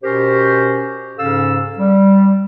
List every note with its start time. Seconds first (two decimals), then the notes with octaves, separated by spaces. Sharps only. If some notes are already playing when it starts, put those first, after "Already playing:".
0.03 B2 C#4 G4 A#4 C5
1.18 G#2 C#3 C#4 A4 F5 E6
1.78 G3